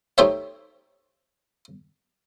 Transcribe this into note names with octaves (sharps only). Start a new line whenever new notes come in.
A3 D#4 G4 C5 C#5 E5